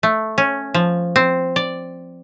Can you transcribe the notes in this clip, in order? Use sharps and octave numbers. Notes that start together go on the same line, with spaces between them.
A3
C#4
F3
C4
D5